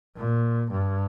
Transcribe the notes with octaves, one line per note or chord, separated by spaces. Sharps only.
A#2
G2